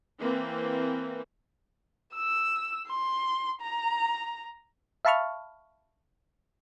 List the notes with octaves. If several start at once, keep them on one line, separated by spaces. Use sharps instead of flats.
E3 A#3 C4
E6
C6
A#5
E5 F5 A5 B5 C#6 F6